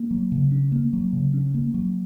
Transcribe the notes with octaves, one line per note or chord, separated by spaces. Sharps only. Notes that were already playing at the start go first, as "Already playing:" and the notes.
Already playing: A#3
F#3
C#3
C#4
A#3
F#3
C#3
C#4
A#3
F#3